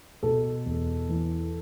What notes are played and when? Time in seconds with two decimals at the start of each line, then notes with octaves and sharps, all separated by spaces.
0.23 B2 A4
0.65 E2
1.09 E3